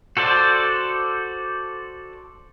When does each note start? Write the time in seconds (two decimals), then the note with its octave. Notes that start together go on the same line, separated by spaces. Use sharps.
0.17 F#4 A4 C5 D5